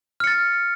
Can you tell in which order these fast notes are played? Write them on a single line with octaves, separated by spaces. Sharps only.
F6 C#7 A6